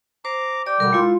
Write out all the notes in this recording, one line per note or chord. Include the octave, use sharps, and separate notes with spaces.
C5 A#5 D6
G4 D5 G5
B2 D3 G3 A#4 B5
G#3 E4 F4